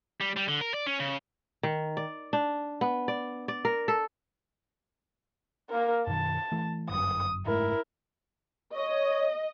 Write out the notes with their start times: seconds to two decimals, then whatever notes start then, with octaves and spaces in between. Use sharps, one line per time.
0.21 G3
0.36 G3
0.48 D3
0.61 A#4
0.74 D5
0.86 C#4
1.00 C#3
1.63 D#3
1.97 D5
2.33 D4
2.81 B3
3.08 D5
3.48 D5
3.65 A#4
3.88 A4
5.69 A#3 A#4
6.07 F#2 B2 D#3 A5
6.52 E3 A3
6.89 G1 F#2 D#6
7.46 F#1 G#2 A3 E4 A#4
8.74 C#5 D#5 C#6